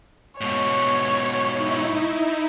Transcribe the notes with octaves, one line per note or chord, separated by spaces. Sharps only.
G#2 B2 C#5
D#4 E4